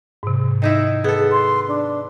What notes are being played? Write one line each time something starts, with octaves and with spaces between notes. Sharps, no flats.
G#2 C3
D#3 D#4 E4
B3 G#4 A4
C6
D4